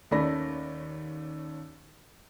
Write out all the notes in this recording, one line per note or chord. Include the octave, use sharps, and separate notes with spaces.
D#2 A3 C#4 D5 B5 A#6